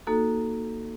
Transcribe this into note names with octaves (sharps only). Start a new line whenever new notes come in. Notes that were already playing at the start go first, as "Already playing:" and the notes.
A#3 D#4 F#4 A4